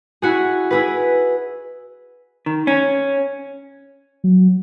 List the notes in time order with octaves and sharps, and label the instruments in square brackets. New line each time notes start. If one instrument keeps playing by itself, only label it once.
[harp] E4 F#4 G#4
E4 G#4 B4
[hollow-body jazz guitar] D#3
C#4
[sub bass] F#3